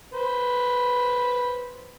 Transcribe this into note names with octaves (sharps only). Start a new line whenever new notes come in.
B4 C5